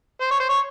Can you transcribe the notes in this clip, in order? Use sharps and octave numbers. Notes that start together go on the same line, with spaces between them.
C5
C#5
C5
C#5